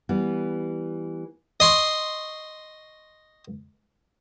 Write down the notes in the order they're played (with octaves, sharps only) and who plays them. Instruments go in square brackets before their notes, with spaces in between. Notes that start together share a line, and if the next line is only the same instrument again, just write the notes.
[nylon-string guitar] E3 G3 B3
[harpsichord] D#5 C6 C#6